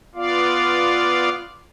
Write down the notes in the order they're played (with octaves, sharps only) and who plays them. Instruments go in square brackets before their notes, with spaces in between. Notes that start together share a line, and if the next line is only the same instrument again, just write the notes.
[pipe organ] B3 F4 D5 F5